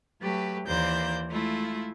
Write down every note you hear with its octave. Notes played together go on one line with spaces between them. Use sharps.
F#3 A3 G4 B4
D#2 E3 A#3 C5 D5 G6
G#3 A3 E4 F4